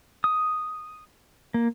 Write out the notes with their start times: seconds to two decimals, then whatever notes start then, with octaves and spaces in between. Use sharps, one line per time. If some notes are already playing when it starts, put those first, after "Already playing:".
0.24 D#6
1.54 A#3